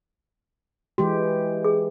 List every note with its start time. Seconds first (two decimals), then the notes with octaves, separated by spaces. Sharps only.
0.98 E3 G#3 F#4 G4
1.64 G#4